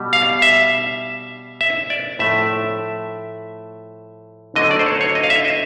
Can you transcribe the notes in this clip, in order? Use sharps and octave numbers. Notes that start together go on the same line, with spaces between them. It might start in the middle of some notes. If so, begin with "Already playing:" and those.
Already playing: B2 G3
F5
E5
E5
D5
A2 F3 A3 E5
D3 F#3 A3 D#5
D5
C5
C#5
C#5
D#5
F5
E5
D#5